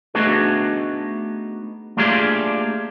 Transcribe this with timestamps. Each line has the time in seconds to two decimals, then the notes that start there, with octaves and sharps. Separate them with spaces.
0.15 A3 B3 D4 D#4 F#4 G#4
1.97 A3 A#3 D4 F4 G4 G#4